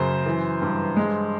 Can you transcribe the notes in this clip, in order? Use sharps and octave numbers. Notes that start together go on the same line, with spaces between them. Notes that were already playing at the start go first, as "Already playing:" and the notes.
Already playing: F#2 C#3 C5
E3
G2
G#3